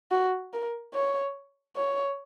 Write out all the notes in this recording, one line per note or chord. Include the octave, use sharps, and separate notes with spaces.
F#4
A#4
C#5
C#5